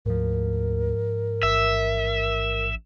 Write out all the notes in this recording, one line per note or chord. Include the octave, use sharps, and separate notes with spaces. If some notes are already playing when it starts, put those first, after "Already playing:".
D2 G#2 F3 A#4
A1 E5